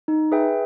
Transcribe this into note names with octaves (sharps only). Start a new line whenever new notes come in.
D#4
G#4 B4 E5 G5